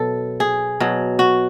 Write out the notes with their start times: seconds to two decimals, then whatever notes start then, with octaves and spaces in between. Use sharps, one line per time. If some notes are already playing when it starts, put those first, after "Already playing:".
Already playing: B2 F#3 A4
0.40 G#4
0.80 B2 F#3
1.19 F#4